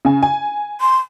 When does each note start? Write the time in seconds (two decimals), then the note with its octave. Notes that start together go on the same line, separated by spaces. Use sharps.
0.05 C#3 G#5
0.23 G#5
0.81 C6